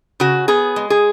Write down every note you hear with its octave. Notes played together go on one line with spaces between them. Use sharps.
C#3 F#4
B3 G#4
G#3
G#4